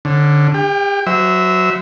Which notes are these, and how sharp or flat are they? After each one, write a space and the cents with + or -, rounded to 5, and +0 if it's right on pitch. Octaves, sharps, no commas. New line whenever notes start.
D3 +0 C#4 -25
G4 +40 G5 +0
F#3 +0 C5 -35 E5 -15